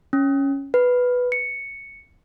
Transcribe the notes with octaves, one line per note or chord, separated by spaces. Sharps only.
C#4
B4
C#7